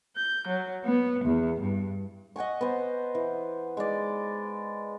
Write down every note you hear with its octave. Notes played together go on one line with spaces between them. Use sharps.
G6
F#3
B3
E2
G2
D#5 F#5 G#5 C#6
B3 C5
E3
G#3 D#4 D5